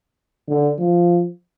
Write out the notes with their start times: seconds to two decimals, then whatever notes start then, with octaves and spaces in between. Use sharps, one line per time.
0.48 D3
0.78 F3